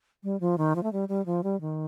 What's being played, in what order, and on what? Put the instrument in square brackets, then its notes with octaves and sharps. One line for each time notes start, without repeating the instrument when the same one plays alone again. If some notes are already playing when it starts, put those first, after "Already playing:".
[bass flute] G3
F3
D#3
F3
A3
G3
G3
F3
G3
D#3